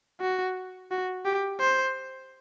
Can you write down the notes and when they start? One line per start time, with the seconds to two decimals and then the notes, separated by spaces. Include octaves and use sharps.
0.21 F#4
0.91 F#4
1.25 G4
1.60 C5